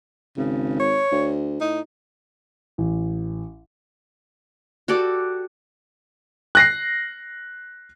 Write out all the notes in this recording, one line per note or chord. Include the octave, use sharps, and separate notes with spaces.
G#1 C#3
C#5
D2
A2 D#4
A1
F#4 G4 A4 D5
F#6 A#6 C7